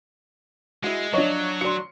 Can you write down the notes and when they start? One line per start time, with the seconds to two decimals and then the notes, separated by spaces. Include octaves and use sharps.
0.84 G#3 E4 F#4
1.14 F3 F#3 D4 C#5 D#5
1.61 D4 F#4 C6 C#7